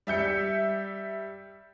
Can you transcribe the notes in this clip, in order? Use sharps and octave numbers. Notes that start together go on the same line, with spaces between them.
G3 E5 G6 C#7